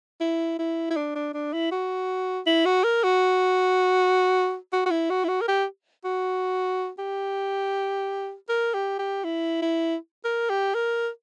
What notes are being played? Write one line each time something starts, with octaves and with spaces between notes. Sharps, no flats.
E4
E4
E4
D4
D4
D4
E4
F#4
E4
F#4
A#4
F#4
F#4
F#4
E4
F#4
E4
F#4
A#4
G4
F#4
G4
A#4
G4
G4
E4
E4
A#4
G4
A#4